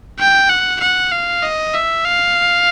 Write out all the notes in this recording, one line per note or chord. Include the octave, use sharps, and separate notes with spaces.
G5
F#5
F#5
F5
D#5
E5
F5